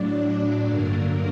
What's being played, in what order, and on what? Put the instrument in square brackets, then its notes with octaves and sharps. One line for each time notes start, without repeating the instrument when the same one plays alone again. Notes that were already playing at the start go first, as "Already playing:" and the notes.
Already playing: [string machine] A2 F#3 D4 D5
D4 D5
G2 D3 F#3 A#3 A#4